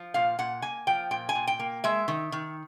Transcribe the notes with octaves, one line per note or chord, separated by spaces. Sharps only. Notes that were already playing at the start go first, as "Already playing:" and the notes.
Already playing: F3
A#2 F5
A#2 F#5
A#3 G#5
F3 G5
A#2 G5
G#5
A#2
G5
A#3
G#3 E5
D#3
D#3